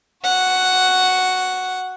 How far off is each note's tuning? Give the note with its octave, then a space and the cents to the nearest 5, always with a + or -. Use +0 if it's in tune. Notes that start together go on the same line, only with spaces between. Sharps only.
F#4 +0 F#5 +0